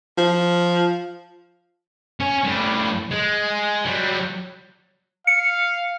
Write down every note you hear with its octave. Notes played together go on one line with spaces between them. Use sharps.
F3
C#4
A2 G3
G#3
F#3 G3
F5 C#7